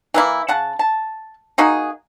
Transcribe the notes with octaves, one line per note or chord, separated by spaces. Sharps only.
E3 A#3 E4
C#3 F#5 A5
A5
A#3 D#4 F#4 G#4